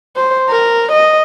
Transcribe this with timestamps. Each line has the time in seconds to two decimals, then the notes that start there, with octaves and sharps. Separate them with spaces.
0.16 C5
0.49 A#4
0.92 D#5